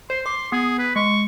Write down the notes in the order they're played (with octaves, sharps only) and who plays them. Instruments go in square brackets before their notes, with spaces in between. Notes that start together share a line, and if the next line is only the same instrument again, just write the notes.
[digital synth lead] C5 [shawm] C6
[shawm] C6 [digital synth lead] D6
[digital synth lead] B3 [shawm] G#4
[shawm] B4
[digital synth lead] G#3 [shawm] C#6